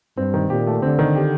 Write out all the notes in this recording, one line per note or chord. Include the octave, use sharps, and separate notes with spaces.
G2 C4
D#3
A#2 G4
A3
D3 C4
D#3
G4